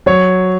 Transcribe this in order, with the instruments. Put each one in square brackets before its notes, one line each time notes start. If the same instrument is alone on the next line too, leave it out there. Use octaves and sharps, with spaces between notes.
[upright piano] F#3 C#5